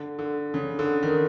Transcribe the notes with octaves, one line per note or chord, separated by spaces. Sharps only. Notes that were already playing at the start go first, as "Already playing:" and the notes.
Already playing: D3
D3
C#3
D3
D#3